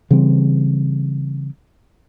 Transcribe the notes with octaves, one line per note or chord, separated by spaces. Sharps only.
C#3 E3 G3 C4